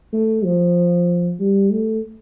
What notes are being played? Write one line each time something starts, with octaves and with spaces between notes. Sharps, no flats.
A3
F3
G3
A3